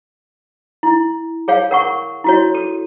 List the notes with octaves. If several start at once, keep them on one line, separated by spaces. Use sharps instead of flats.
E4
G#4 C#5 F5
A#4 F#5 C#6
E4 F#4 C#5
A4